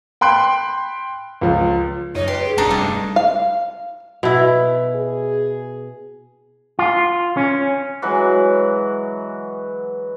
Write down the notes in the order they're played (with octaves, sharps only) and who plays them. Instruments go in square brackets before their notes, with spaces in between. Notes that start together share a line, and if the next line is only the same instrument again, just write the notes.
[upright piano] G5 B5 C6 F#6 D7
C#2 F3
[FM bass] F#2 [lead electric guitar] D#4 [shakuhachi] C#5
[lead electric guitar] G4 [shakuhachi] B4 [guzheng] C6
[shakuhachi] G#4
[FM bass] E1 [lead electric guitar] C3 A3 [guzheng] D4 D#4
[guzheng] G2 [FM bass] G3
[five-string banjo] F5
[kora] B2 E4
[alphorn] G#4
[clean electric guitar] F4
C#4
[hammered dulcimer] E3 F#3 G#3 F#4